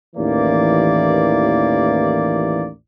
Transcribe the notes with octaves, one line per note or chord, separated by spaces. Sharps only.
A1 D#2 E3 A#3 D5